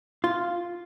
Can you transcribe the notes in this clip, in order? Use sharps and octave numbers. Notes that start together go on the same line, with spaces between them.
F4